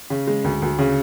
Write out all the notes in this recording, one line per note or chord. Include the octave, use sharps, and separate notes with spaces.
C#3
G#3
D2
D2
C#3